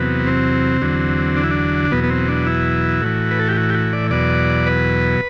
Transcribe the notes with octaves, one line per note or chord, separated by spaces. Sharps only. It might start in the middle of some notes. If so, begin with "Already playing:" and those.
Already playing: E2 C3 F#3 B3
C4
E2 D3 F#3
D4
E4
D4
E2 B2 F#3 B3
B3
C4
D4
E4
A2 E3 F#4
B4
A4
G4
F#4
G4
F#4
D5
E2 B2 F#3 D5
B4